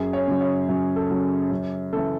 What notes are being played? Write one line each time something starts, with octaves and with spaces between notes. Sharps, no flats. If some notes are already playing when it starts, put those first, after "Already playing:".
Already playing: F#2 G#4
C#5
C#3 F#3
C#5
F#2
A4
C#3 F#3
F#2
C#3 E3 A4